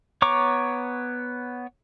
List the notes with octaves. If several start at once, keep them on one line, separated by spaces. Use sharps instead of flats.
B3 C#5 A#5 C#6 D6